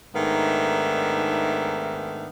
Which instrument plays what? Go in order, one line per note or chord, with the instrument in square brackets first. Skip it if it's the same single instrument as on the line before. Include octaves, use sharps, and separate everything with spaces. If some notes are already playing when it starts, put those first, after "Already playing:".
[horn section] G#2 D#3 A3 B3 D4 E5